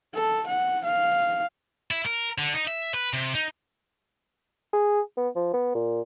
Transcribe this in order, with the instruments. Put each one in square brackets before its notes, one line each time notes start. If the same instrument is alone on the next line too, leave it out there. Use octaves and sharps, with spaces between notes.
[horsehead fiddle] A4
F#5
F5
[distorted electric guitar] E4
A#4
D3
D#4
E5
B4
C3
D#4
[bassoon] G#4
B3
F3
B3
A#2